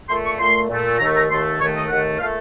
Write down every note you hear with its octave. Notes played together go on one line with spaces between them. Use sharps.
A#2 A3 C6
C#6
A#2 A3 C6
A#2 A3
D#2 D#3 A3 A#5
A#5
D#2 D#3 A3 C6
D#2 D#3 A3 C#5
D#5
D#2 D#3 A3 F#5
A#2 A3 F5